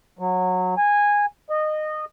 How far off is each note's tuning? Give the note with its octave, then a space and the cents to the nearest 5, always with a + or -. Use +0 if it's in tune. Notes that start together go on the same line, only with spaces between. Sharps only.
F#3 -15
G#5 -15
D#5 -20